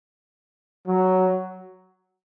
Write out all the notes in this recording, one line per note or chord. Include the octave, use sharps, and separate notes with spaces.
F#3